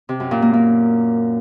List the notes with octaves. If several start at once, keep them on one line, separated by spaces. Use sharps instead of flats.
C3
F#2
A#2
A#3
A#3